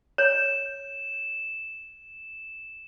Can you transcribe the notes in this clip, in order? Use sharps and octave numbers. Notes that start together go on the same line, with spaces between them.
C#5 E7